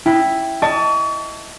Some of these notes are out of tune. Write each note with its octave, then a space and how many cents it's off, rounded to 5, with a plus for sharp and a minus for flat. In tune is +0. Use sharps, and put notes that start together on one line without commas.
E4 +0 G5 +0
D#5 +0 A5 +10 C#6 +40